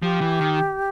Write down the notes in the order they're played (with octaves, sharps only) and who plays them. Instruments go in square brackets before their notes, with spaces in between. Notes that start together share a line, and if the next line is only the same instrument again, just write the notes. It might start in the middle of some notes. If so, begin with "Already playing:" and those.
[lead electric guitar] F3 [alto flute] G4
[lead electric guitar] E3
D#3